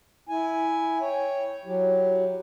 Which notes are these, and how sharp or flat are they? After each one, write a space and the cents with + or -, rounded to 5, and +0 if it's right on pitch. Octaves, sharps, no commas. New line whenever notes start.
E4 -5 G#5 +0
C#5 +0 G5 +0
F#3 +0 E4 +0 G4 +0